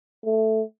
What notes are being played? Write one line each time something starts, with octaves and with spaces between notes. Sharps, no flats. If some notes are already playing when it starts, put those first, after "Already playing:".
A3